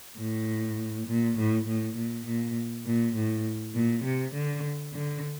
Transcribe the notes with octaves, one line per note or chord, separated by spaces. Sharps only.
A2
A#2
A2
A2
A#2
A#2
A#2
A2
A#2
C3
D3
D3